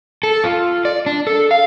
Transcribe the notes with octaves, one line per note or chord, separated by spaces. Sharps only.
A4
F4
D5
D4
A4
F5